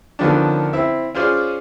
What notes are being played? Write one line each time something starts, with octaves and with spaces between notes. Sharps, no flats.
D3 D#3 F3 B3 C#4 D4
C4 E4 E5
C#4 F4 G#4 C5 D5